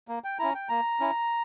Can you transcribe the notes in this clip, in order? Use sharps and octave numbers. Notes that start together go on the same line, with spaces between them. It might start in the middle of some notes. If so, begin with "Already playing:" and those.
A#3
G5
C#4 E4 A#5
G5
A#3 A#5
C#4 E4